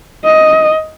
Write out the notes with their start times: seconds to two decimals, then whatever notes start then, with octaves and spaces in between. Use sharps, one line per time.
0.24 D#5